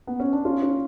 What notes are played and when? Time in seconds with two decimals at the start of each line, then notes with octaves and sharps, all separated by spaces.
0.07 B3
0.20 C#4
0.32 D4
0.45 C#4 F4
0.62 C#4 F4